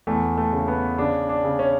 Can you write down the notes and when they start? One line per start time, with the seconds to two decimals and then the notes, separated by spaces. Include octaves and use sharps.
0.07 E2 A3
0.37 A3
0.53 C#3
0.68 B3
0.98 C#3 D4
1.29 D4
1.44 C#3
1.59 C#4